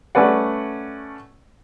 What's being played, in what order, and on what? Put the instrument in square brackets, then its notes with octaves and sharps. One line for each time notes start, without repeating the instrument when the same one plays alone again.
[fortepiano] A3 C#4 B4 D5 F#5